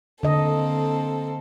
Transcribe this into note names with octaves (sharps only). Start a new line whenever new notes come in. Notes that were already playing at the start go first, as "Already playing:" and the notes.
D3 A#3 C4 A4 D#5